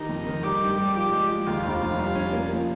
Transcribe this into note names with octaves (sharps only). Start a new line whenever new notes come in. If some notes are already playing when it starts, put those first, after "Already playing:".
Already playing: D#3 D#4 G4
F2
D#3
G3 G4
G2
G3
F3 G4
G#3
F3
D#2 F4
F1
F1
G3
C#4
A#3
F3